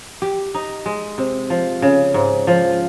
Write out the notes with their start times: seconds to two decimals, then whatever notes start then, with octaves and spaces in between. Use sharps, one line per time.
0.22 G4
0.54 D#4
0.86 G#3
1.18 C3
1.50 F3
1.82 C#3
2.14 G#2
2.47 F3